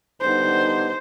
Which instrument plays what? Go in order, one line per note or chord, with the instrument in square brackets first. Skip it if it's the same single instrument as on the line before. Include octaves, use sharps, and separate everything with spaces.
[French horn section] D3 G3 B3 D#4 [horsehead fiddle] C5